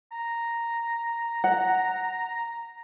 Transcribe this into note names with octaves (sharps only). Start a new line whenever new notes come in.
A#5
F#5